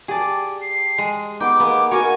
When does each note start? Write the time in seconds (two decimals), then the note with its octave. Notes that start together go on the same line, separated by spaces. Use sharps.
0.08 G4 G#4 D5 A5
0.62 C7
0.98 G#3
1.40 B3 D#4 G5 D6
1.60 G#3 A#3 B3
1.91 A#3 F#4 C#5 G#5